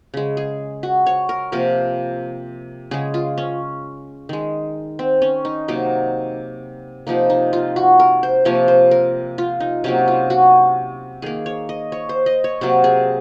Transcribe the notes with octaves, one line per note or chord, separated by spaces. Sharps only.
C#3 G#3
G#4
F#4
C#5
A#4
C3 F3 A#3 A#4
C#3 G#3 G#4
F4
C#4
D#3 G#3
C4
C#4
D#4
C3 F#3 A#3 D#4
C3 F3 A#3 D#4
D#4
F4
F#4
A#4
C5
C3 F3 A#3 C#5
C5
A#4
F4
D#4
C3 F#3 A#3 C#4
F4
F#4
D#3 A#3 G#4
C#5
D#5
C#5
C5
D#5
C#5
C3 F#3 A#3 C5
G#4